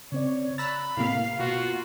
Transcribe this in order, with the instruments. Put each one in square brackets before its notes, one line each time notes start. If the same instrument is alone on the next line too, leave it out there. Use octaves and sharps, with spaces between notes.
[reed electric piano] C#3 C4 D5 [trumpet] C#5
[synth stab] A#5 E6 F#6 [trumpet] B5 [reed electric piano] A6
[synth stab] A2 C3 A#3 [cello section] F5
[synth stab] B2 [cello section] A#3 F4 [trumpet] F#4